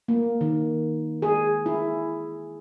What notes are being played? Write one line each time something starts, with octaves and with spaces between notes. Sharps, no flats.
A#3
D#3
G#4
E4